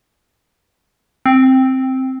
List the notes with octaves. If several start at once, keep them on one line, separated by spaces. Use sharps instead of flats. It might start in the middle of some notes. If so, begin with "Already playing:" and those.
C4